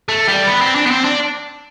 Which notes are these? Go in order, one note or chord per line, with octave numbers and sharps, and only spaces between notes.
A3
G3
B3
C4
D4
B3
C4
D4